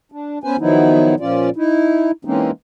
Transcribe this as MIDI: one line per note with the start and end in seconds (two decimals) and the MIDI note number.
0.12 0.39 62
0.44 0.56 59
0.44 0.56 61
0.44 0.56 71
0.44 0.56 72
0.44 0.56 80
0.59 1.15 51
0.59 1.15 53
0.59 1.15 54
0.59 1.15 59
0.59 1.15 63
0.59 1.15 64
1.20 1.50 46
1.20 1.50 53
1.20 1.50 61
1.20 1.50 65
1.20 1.50 74
1.56 2.11 63
1.56 2.11 64
2.25 2.51 52
2.25 2.51 56
2.25 2.51 58
2.25 2.51 60
2.25 2.51 61
2.25 2.51 63